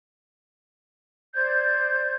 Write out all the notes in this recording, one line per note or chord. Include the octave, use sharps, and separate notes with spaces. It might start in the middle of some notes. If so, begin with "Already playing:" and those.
C5 D5 G6 G#6